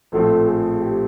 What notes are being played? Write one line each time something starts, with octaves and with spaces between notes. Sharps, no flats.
A#1 A2 F3 A3 C4 A4
G#4
G4